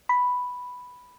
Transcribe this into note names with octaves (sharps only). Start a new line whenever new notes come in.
B5